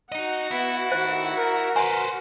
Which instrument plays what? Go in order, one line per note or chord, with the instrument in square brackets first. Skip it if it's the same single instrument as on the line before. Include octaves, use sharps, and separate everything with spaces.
[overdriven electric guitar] D#4 D#5 [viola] F#4 F#5
[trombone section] B3 [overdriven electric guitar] E4
[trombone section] A2 D#3 [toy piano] C5
[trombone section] A#4
[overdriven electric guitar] B4 C5 [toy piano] G#5 C6